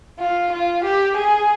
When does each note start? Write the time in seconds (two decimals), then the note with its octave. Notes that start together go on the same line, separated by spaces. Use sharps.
0.19 F4
0.52 F4
0.84 G4
1.16 G#4